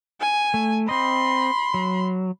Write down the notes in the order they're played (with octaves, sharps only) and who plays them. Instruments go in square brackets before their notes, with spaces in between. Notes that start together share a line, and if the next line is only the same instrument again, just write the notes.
[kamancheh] G#5
[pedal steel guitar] A3
[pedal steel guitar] C4 D#5 [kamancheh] B5 C6
[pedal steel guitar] F#3